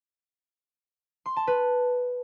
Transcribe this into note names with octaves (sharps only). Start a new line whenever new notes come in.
C6
A5
B4